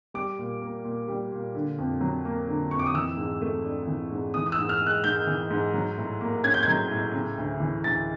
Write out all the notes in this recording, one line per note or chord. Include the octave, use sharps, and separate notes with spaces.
G3 D6
A#2
A#3
A#2
G3
A#2
D3
F2
F#3
A#3
D3
F2 C#6
D6
D#6
E3 E6
G#2
A3
D4
E3
G#2
E3 D#6
D#6
E6
G#2
F6
G#3
F#6
G#2 G6
E3
G#2
F#3
A2
A#3
C#4 G#6
G6
F#3 G#6
A2
C#3
D2
E3
D2 A6